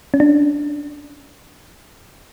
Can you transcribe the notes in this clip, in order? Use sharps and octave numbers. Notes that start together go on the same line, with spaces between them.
C#4
D4